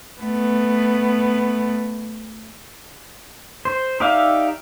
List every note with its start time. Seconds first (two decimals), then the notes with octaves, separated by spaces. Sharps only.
0.20 A3 B3
3.65 C5
4.00 D#4 G4 D5 E5 F5